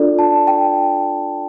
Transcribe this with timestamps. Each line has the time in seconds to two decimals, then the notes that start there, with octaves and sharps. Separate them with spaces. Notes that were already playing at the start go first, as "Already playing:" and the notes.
Already playing: D4 F4 A4 D5
0.19 A5
0.47 G5